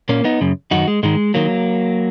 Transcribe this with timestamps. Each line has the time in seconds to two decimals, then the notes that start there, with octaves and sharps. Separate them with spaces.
0.09 A#2 A#3 C#4
0.24 B3 D#4
0.41 F#2 C#3
0.71 F#2 D#3 D#4 F#4
0.88 G#3
1.03 G#2 D#3 G#3
1.34 D#3 F#3 A#3